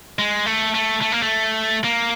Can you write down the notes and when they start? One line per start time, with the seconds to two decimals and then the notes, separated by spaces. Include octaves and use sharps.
0.19 G#3
0.46 A3
0.74 A3
1.01 A3
1.12 A#3
1.22 A3
1.84 A#3